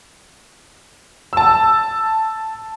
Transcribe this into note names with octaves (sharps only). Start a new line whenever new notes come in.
A5 E6